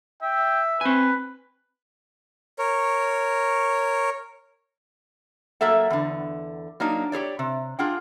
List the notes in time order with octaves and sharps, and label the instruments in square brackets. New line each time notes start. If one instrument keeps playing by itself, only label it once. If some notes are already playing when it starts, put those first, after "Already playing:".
[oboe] E5 [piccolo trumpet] G5
[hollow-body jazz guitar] C4 G#5 [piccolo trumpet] B4
[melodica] A#4 C#5
[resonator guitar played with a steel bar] F#3 A#3 A4 E5 F#5
E2 D3
F#3 A#3 D4 D#4
G4 G#4 C#5 D5
C3
D4 F4 G#4 F#5 G5